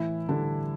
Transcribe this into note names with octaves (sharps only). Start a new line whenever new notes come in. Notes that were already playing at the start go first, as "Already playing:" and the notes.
Already playing: A2 E3 E4
D3 E3 G3 D4